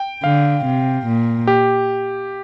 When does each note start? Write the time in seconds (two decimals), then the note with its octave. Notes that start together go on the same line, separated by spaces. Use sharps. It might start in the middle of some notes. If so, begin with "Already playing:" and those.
Already playing: G5
0.23 D3 F5
0.65 C3
1.07 A#2
1.47 G4